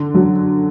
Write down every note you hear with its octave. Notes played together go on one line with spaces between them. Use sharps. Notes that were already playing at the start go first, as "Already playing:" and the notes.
Already playing: D3
F#3